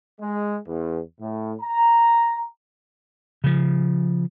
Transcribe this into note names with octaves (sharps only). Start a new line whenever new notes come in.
G#3
E2
A2
A#5
C#3 F3